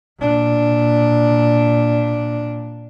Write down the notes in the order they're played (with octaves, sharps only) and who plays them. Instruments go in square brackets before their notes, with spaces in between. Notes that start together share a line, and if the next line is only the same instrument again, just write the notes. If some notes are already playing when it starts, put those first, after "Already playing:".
[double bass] A#2 D4